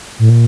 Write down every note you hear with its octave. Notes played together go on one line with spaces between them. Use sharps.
A2
A#2